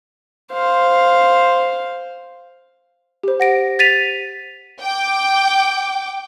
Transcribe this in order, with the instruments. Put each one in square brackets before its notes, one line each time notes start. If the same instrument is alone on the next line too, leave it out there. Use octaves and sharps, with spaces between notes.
[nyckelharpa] C5 F5
[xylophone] G4 C5
F#5 A#6 D7
A6 B6 D#7 F7
[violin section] G5 D6